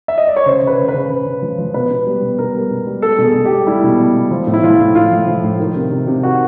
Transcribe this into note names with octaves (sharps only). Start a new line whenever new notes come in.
E5
D#5
D5
C#5
C#3 C5
C#3
B4
C#3
B4
C#3
C#3
C#3
F3
F3
B2 B4
B2
G3
B2
B2 A#4
G3
B2
G3
G3 A4
B2
G#4
B2
G4
G3
G3 E4
B2
B2
B2
F3
A2
E4
F3 F4
A2
A2 F4
F3
F3
A2
D#3
C3
C3
C3
D#3 F#4